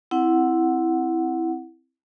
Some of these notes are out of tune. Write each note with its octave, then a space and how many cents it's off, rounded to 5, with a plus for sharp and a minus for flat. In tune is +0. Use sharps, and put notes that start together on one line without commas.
C4 +0 E4 +0 F#5 +0